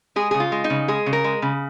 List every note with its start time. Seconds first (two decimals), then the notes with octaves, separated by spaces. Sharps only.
0.16 G#3 G#4
0.31 C#3 G#4
0.40 F4
0.52 G#3
0.64 D#4
0.70 C#3
0.88 G#3 G#4
1.06 C#3
1.13 A#4
1.24 G#3
1.42 C#3